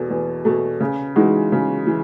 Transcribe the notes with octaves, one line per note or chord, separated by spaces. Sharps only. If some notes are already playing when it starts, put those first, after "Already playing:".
Already playing: E2 B2 A3
E2
B2 A3
C#3
E3 G#3 D#4 F#4
C#3
E3